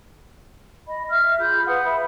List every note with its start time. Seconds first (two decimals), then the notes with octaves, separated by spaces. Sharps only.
0.87 D#5 B5
1.08 E5 F6
1.39 F4 G#4 B5 G6
1.66 B4 F5 F#5 D#6
1.84 E5 B5